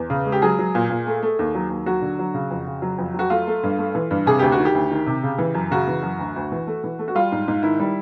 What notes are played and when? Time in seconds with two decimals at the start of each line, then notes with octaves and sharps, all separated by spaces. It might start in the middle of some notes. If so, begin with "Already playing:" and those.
Already playing: E2
0.10 C#3
0.26 G#3
0.32 G4
0.42 F#3 G#4
0.59 F#3
0.75 A#2
0.90 A#2
1.07 A3
1.23 A3
1.39 D#2
1.55 F#3
1.70 D#2
1.86 F#3 F#4
2.02 D3
2.19 F#3
2.34 C#3
2.51 F2
2.67 C#3
2.82 F#3
2.98 F2
3.14 F#3 F#4
3.30 A3 F4
3.47 A3
3.63 G2
3.78 A3
3.95 E3
4.11 G2
4.26 C3 G#4
4.39 D2 G4
4.52 F#4
4.59 D#3
4.65 G4
4.75 D2
4.91 D#3
5.06 C3
5.23 C#3
5.38 E3
5.54 F#2
5.71 C#3 F#4
5.88 E3
6.03 F#2
6.19 D2
6.36 D2
6.52 E3
6.67 A3
6.84 E3
6.99 A3
7.08 F#4
7.15 G3 F4
7.32 G#2
7.48 G#2
7.63 D#3 E4
7.80 G3